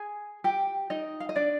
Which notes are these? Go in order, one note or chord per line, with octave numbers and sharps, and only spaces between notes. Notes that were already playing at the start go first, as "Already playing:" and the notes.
Already playing: G#4 G#5
G4 G5
D#4 D#5
F5
D#5
D4 D5